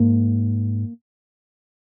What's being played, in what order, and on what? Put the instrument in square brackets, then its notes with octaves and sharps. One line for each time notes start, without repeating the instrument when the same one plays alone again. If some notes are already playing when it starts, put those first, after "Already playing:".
Already playing: [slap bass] G#2 [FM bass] A#3